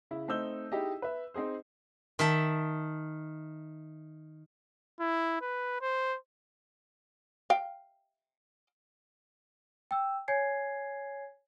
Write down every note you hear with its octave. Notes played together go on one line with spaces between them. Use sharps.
C#3 E4
A3 C4 D#4 E6 G6 G7
D#4 E4 G4 G#4 D#5
B4 E5
C4 D#4 G#4 C5
D#3 E5 A5
E4
B4
C5
F5 G5
G5 E6
C#5 G#5 G#6 C7